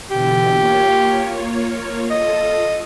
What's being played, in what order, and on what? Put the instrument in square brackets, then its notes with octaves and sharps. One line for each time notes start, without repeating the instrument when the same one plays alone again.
[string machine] B2 D3 E3 [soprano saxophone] G4
[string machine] A#3 F4 C#5
[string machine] F4 A4 [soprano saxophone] D#5